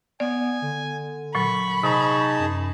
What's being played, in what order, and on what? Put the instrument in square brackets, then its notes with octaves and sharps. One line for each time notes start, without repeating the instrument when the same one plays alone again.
[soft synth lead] B3 [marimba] D5 [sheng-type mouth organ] G#5
[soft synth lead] D3
[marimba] A#2 F#3 [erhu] B5 [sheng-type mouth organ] C#6
[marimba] C3 [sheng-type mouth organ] D#4 G#4 A5 [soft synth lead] C#6
[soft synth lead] F#2